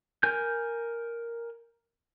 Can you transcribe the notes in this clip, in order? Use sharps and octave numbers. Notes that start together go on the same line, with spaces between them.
A#4 G#5 G6